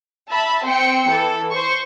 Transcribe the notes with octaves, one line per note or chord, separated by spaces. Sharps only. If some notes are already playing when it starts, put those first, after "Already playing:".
E5 A5 B5
C4 C5 G5 C#7
E3 A4
C5 C#6